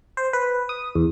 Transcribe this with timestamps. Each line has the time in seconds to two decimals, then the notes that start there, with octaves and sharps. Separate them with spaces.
0.17 C5
0.33 B4
0.69 D#6
0.95 E2